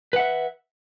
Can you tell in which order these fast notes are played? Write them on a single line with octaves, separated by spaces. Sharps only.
B4 F#5 E5